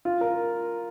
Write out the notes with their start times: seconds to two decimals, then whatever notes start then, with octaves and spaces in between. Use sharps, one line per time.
0.05 F4
0.21 A#4